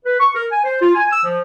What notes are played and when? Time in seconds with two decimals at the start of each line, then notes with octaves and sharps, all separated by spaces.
0.05 B4
0.20 C#6
0.35 A#4
0.52 G#5
0.64 C5
0.82 F4
0.95 G#5
1.12 E6
1.24 F3